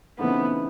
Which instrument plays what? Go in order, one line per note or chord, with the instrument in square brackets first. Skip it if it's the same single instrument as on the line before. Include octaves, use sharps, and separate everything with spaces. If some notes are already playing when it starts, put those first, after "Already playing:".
[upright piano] C#3 E3 A3 C4 D#4 [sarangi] B3